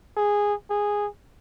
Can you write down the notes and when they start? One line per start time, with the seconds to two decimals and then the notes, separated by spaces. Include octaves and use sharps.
0.17 G#4
0.70 G#4